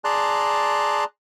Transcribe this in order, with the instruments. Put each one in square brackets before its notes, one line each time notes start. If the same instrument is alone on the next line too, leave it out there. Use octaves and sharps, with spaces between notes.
[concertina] G#4 D5 A5 A#5 C6 F#6